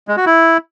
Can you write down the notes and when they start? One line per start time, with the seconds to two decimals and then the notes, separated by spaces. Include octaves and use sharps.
0.08 G#3
0.17 F#4
0.26 E4